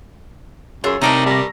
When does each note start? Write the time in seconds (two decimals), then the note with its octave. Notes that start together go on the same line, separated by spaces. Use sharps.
0.84 F#2 F4 G#4 C#5 E6
1.02 C3 A3 D#4 A#4 D5 A5
1.26 G3 A#5 A#6